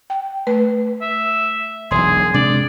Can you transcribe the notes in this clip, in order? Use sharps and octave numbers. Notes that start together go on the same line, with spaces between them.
G5
A3 B4
E5
E1 B1 G#4 C6
C3 G#3 D4 D5